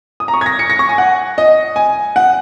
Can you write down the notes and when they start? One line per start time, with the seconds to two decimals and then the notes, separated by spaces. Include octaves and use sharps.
0.20 D#6
0.28 A#5
0.34 C#6
0.41 G#6
0.46 A#6
0.59 C#7
0.70 A#6
0.79 C#6
0.89 G#5
0.98 F#5
1.38 D#5
1.76 G#5
2.16 F#5